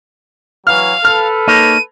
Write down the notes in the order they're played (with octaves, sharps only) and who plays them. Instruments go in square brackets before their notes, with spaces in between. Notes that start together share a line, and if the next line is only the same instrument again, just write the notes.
[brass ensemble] E3 F#3 [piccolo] F5 [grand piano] F6
[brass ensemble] A4 B4 [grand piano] F6
[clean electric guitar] A#3 D#4 C#5 [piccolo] D#7